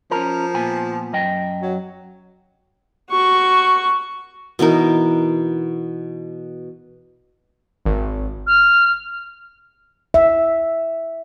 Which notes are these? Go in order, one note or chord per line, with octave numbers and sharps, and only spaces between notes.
F3 C#4 A#4
A#2 B3 G#5
F#2 D#5 G5
F#3
F#4 C#6
B2 E3 D#4 A#4
G#1
F6
E5